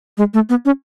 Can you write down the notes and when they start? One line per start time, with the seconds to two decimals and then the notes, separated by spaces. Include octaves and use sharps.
0.18 G#3
0.34 A3
0.49 B3
0.65 C#4